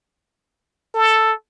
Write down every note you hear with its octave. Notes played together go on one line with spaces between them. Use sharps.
A4